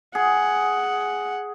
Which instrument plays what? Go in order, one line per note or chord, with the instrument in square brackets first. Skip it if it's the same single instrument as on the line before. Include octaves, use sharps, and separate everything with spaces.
[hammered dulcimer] G#4 [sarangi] F#5